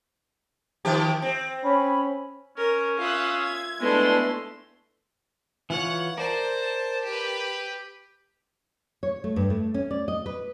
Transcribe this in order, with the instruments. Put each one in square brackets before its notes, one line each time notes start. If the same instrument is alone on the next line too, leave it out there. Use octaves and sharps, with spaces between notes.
[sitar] D#3 F3 G4
C4
[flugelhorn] C#4 [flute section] B5
[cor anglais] C#4 [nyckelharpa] A#4
[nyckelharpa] F4 E5 [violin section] F5 D#6 F#6
[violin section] G#6
[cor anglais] G#3 [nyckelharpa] A3 C6 [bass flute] B3 [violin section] D4 E4
[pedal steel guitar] E3 F4 C#5 [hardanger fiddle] F#5
[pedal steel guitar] A#4 D5 [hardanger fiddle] C5 A5
[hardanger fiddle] G4 B4
[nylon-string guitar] C#5
A3
G2
A3
C#4
D5
D#5
B4